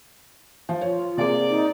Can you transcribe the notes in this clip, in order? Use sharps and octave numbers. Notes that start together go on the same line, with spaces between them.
F3
F4 C#5
C3 A#3 G#4 D5
D#4